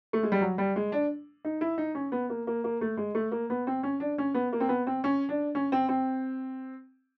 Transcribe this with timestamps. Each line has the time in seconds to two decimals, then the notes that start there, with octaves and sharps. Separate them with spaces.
0.13 A3
0.23 G#3
0.32 G3
0.41 F#3
0.58 G3
0.76 G#3
0.92 D4
1.45 D#4
1.61 E4
1.78 D#4
1.95 C#4
2.12 B3
2.30 A#3
2.47 A#3
2.64 A#3
2.81 A3
2.97 G#3
3.15 A3
3.32 A#3
3.50 B3
3.67 C4
3.83 C#4
4.00 D4
4.18 C#4
4.34 B3
4.53 A#3
4.60 C4
4.69 B3
4.87 C4
5.04 C#4
5.29 D4
5.55 C#4
5.72 C4
5.89 C4